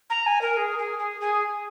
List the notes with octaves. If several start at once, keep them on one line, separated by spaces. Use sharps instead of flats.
A#5
G#5
A#4
G#4
G#4
G#4
G#4